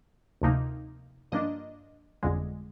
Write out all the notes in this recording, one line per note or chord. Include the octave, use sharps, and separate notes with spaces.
D2 C3 F3 A#3 D#4
G2 F3 A#3 D4 D#5
G1 F2 D3 G#3